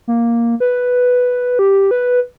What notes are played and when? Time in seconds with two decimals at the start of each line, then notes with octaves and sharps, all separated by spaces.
0.08 A#3
0.60 B4
1.59 G4
1.91 B4